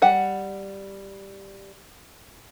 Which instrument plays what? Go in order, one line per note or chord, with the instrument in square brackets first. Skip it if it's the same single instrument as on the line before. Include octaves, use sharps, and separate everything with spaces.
[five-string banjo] G3 F#5